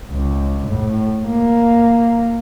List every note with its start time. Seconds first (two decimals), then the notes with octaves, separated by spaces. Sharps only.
0.11 C#2
0.67 A2
1.26 A#3